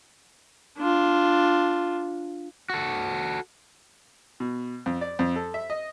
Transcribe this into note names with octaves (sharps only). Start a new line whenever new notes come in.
D4 F4
F#4 A4
B2
F2
D5
F2
A4
E5
D#5